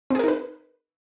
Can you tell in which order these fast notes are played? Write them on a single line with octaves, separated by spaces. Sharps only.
C4 G#4 A#4 D#4 B4